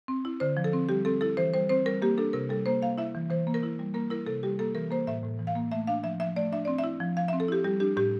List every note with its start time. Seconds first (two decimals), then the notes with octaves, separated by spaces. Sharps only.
0.08 C4
0.25 E4
0.40 D3 C5
0.57 F3
0.64 A4
0.73 C4
0.89 G3 G4
1.05 C4 A4
1.21 E4 A4
1.37 E3 C5
1.54 G3 C5
1.69 C4 C5
1.85 G3 A#4
2.02 A#3 G4
2.17 D4 A4
2.33 C3 A#4
2.49 G3 A4
2.66 A#3 C5
2.82 A#3 F5
2.98 E4 E5
3.15 E3
3.30 E3 C5
3.47 A#3
3.54 A#4
3.63 E4
3.79 G3
3.94 A#3 A#4
4.11 E4 A#4
4.27 C3 A4
4.43 G3 G4
4.59 A#3 A4
4.75 E3 A#4
4.91 A#3 C5
5.07 A2 E5
5.23 A2
5.39 E3
5.47 F5
5.55 A#3
5.72 A3 E5
5.87 D4 F5
6.03 F3 E5
6.20 F3 E5
6.36 A3 D5
6.52 D4 E5
6.65 C4 D5
6.78 E5
6.84 E4
7.00 F3
7.17 F3 F5
7.28 E5
7.33 C4
7.40 A4
7.48 E4 G4
7.64 G3 G4
7.80 D4 G4
7.97 A2 G4